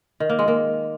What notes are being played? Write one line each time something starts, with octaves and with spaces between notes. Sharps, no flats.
D#3
A#3
G#3
A#3